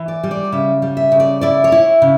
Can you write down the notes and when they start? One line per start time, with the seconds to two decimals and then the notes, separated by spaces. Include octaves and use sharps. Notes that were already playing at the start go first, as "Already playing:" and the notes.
Already playing: E3
0.08 D5
0.23 G3
0.31 D5
0.52 C#3 E5
0.82 G3
0.97 E5
1.12 C#3
1.20 D5
1.41 E4 D5
1.64 C#5
1.72 E4
2.02 C#3